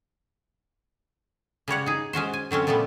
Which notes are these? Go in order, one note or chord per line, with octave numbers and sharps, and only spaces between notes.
C#3 G3 C#5 F#5
D#4 G#4
G#3 C#4 F#4 C5
G#5
D3 F#3 C4 C#4
A#2 F3 G3 A3 B3